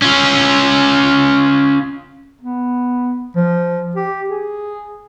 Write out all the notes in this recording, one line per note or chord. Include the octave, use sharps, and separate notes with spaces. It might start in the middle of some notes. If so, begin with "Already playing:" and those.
C#4 F4
B3
F3
G4
G#4